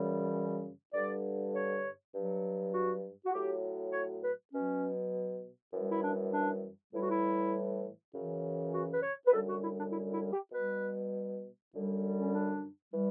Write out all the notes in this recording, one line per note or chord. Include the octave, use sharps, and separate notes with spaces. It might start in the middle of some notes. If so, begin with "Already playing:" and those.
Already playing: F#2 C#3 E3 G3
G2 D3 G3 D5
C#5
G2 F#3
F#4
F#4
A2 F#3 G4
C#5
B4
B2 F#3 C#4
F#2 E3 G3
E4
D4
D4
A2 E3 G3 E4
F#4
E4
F#2 C#3 E3
F#4
B4
C#5
B4
F#2 D3 G3 A4
F#4
E4
D4
E4
E4
G4
B2 G3 B4
F#2 D3 G3
C#4
D4
E3 G3